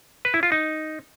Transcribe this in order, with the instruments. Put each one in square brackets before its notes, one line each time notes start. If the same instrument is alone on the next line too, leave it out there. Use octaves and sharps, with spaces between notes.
[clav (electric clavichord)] B4
E4
F4
D#4